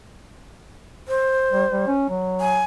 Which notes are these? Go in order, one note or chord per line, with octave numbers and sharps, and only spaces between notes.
C5
G3
G3
C#4
F#3
G#5